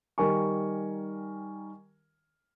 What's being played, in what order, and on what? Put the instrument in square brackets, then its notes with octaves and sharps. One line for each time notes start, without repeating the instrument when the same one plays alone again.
[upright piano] D#3 G3 A#4 G#5 C#6